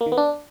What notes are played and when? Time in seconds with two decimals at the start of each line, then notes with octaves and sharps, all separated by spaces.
0.01 A#3
0.06 D#3
0.12 B3
0.17 D4